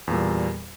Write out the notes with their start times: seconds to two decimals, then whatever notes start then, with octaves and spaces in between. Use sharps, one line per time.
0.08 E2
0.10 A#2
0.13 G3